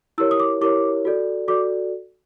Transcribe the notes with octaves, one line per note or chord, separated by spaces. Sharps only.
E4 G4 A#4 C#5 E6
D#6
D6
E4 G4 A#4 C#5 D6
F#4 A4 D5
F#4 A4 D5 D6